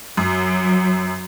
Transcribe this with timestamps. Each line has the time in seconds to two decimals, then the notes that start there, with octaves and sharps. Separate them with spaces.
0.17 F#2 F#3